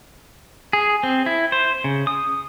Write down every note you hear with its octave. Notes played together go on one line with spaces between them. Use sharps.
G#4
C4
E4
C5
C#3
D#6